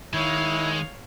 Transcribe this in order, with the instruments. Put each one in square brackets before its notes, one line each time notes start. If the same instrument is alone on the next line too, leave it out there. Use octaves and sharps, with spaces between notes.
[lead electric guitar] D#3 [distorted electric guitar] G#3 [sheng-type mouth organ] E4 [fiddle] C#5 F5